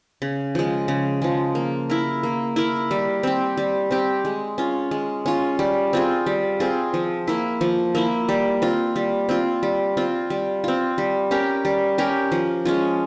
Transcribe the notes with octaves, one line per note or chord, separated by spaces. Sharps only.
C#3
F3 G#3
C#3
F3 G#3
A#3
E4 A#4
A#3
E4 A#4
G3
C4 G4
G3
C4 G4
G#3
C#4 F4
G#3
C#4 F4
G3
C4 F4 G#4
G3
C4 F4 G#4
F3
A#3 E4
F3
A#3 E4
G3
C4 F4
G3
C4 F4
G3
C4 F4
G3
C4 F4
G3
C#4 G4 A#4
G3
C#4 G4 A#4
F3
G#3 C#4 F4